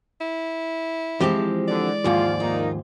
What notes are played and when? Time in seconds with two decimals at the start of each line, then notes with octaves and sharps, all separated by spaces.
0.21 E4
1.20 E3 F3 G#3 C4 G4
1.68 D3 D5
2.04 D#2 G#2 F3 F4
2.40 A#3 D#4 F4